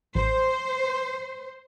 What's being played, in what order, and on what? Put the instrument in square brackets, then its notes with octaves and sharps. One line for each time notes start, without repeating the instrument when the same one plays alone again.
[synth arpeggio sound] A1 [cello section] C5